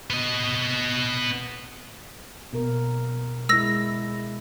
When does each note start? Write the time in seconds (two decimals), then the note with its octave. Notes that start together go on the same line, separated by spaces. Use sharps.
0.10 B3 D#5
2.53 B2 A#4
3.49 G#3 E4 E6 A#6